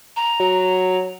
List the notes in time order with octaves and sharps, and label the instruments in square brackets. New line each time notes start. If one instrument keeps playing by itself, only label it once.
[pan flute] A#5
[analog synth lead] F#3